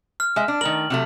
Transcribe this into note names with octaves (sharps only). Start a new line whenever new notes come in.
F6
G#3 E5
D4
D#3 A3 A#4 F#7
C3 F#3 A3